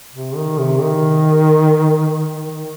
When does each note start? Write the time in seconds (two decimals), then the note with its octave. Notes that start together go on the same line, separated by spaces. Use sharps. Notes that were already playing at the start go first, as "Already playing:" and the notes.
0.13 C3
0.36 D#3
0.59 C3
0.82 D#3
2.34 D#3
2.51 D#3